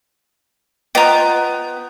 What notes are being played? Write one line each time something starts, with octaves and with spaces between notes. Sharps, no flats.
B3 F4 C5 D#5 G5 A#5 G6